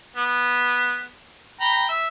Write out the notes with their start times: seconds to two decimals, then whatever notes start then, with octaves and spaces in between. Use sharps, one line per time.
0.16 B3
1.60 G5 A#5 B5
1.89 E5